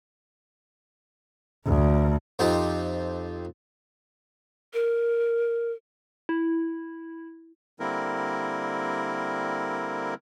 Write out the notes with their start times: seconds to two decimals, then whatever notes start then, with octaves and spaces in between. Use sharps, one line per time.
1.67 D2
2.39 F2 C4 D#4 G4
4.74 A#4
6.29 E4
7.80 D3 G3 A#3 C4 E4 A#4